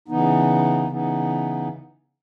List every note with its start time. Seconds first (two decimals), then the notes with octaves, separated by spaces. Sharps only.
0.08 C#3 E3 B3 D#4
0.88 C#3 E3 B3 D#4